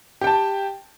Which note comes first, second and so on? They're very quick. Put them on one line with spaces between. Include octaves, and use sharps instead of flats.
G4 G5 A5